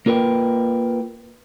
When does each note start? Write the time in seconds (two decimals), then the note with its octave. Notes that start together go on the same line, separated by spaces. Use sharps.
0.06 A#3 F4 A#4 B4 G5